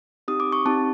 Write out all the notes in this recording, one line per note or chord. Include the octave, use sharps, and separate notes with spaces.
C4 D#4 G4 D#6
D6
C#6
C4 D#4 G4 A5